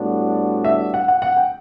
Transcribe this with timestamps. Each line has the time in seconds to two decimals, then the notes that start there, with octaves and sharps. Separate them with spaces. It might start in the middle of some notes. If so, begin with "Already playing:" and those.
Already playing: A2 G3 B3 D4 F#4
0.64 E5
0.94 F#5
1.08 F#5
1.22 F#5
1.37 G5